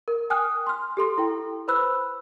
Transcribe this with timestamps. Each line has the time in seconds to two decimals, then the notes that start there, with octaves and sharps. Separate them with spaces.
0.08 A#4
0.30 G5 G#5 D#6 F6 F#6
0.67 C6 F6
0.97 G4 A4 C6
1.18 E4 A4 G5
1.68 B4 C5 B5 E6 F#6